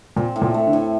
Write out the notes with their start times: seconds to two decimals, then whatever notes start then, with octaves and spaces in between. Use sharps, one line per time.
0.16 A#2 C4
0.36 A2
0.42 A#2
0.54 A3
0.67 D3
0.73 A2